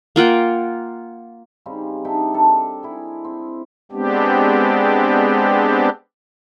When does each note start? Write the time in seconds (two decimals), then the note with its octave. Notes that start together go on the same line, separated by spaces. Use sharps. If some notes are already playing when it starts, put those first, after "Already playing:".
0.16 A#3 F4 F#5 G5
1.66 C#3 G3 C4 D#4
2.05 D4 D#4 E5 G5
2.34 D4 A4
2.83 E4 G#4
3.24 C4
3.92 G#3 B3 C4 D4 G4